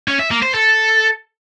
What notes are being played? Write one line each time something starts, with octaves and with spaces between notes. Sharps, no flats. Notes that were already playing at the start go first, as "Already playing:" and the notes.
C#4
E5
A#3
C5
A4